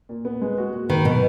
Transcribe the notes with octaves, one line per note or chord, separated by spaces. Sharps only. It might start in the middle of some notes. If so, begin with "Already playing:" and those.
A#2
B3
G#3
F#4
A#2
D#3 B4
B2 F#3